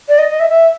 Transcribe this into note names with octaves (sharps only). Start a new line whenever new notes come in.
D5
D#5
D#5
E5
E5